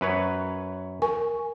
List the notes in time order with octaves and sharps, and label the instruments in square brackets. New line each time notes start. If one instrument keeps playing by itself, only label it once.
[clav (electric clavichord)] F#2 B4 C#5
[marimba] A#4 G#5 C#6